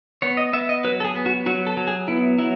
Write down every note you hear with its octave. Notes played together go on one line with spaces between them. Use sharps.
B3 C#5
D#5
B3 E5
D#5
F#3 B4
A4
G#4
B3
F#4
F#3 F#4
A4
F#3
G#4
B3 E4
F#3 E4